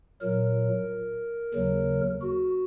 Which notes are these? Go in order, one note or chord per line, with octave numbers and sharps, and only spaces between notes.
A#2 F#3 A#4
D#2 C#3 F#3
F#4